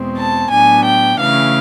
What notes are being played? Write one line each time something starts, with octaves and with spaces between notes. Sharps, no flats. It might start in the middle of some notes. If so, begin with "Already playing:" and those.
Already playing: E2 B2 G#3 C4
A5
A2 F#3 B3 D4 G#5
G5
C#3 E3 A3 F5